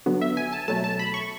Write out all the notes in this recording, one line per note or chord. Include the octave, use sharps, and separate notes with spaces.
D3 F#3 B3
E5
G#5
A5
B2 F#3 A3 A5
A5
B5
C#6